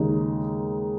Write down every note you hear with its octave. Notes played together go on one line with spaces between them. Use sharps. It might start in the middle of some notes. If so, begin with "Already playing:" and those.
Already playing: D#2 C#3 G#3 D#4